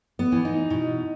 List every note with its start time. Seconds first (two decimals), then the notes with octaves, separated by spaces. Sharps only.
0.19 B3
0.32 E3
0.45 D#4
0.70 B2